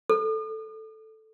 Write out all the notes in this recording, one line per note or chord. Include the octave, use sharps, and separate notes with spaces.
A4